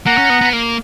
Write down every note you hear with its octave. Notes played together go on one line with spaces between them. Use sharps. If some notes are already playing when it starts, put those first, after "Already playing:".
A#3 F#5 A#5
C#4
B3
B3
A#3